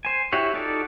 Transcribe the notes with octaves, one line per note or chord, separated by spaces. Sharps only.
C5 G#5
E4 F#4 G4 C#5
D#4 F4 F#4 A4 D5